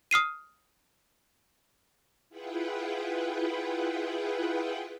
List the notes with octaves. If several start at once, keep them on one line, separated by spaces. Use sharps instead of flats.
D#6 F6 C7 D#7
E4 F4 G#4 B4 F#5 G5